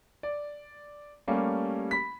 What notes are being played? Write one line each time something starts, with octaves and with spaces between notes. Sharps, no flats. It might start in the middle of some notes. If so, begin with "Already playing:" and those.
D5
G3 A3 A#3 C#4
B5 B6